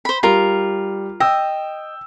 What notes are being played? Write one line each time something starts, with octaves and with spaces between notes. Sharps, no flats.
C5 B5
G3 F4 A#4
D#5 G5 E6